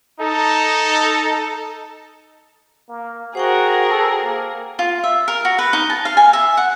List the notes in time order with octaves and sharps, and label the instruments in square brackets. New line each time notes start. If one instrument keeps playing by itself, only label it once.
[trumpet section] D#4 A4
[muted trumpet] A#3
[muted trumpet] F#4 [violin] G#4 A#4 [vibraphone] C5 F#5 G5
[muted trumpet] A4
A#3
[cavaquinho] F4
E5
A#4
F#4
B4
D#4
A5
F5
G#5
E5
F#5